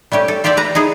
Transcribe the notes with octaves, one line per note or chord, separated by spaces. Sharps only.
G3 A3 C#4 G4
A4
F4 G4 C5 D5 E5 G5
B4 A5 A#5
D#4 E4 G#4